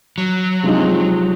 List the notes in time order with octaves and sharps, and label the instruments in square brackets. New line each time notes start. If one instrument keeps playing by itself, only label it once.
[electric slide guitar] F#3
[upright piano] C3 F3 G#3 C4 D#4